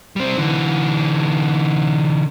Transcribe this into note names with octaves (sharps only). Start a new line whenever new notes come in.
G3 C4
D3 E3